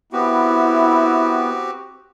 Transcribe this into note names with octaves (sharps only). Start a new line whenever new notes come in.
B3 C4 E4 F#4 G4